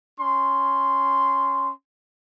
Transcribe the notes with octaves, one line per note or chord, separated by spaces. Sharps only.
C#4 C6